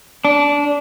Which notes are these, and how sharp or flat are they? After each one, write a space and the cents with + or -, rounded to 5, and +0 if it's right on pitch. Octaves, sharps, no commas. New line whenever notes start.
D4 -20